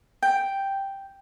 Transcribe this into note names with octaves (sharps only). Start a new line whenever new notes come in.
G5